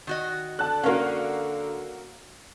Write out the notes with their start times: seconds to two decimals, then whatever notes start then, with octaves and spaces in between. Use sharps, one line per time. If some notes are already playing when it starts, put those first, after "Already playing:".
0.07 D#3 F#4 D#5
0.59 D3 A5 F#6
0.83 A#3 C#4 F#4 A#4 F5